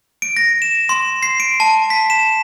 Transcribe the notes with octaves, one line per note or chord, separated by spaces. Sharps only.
D7
A#6
E7
C6
C7
D7
A5
B6
E7